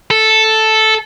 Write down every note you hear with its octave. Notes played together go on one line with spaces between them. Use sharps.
A4